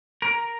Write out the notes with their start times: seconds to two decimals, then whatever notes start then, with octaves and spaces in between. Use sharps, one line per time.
0.22 A#4